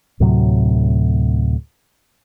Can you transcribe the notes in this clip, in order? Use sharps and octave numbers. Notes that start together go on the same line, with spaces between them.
D2 A2 C3 F#3